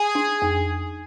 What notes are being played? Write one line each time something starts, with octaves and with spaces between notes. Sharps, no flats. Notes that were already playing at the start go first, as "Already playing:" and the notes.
Already playing: G#4
D4
F2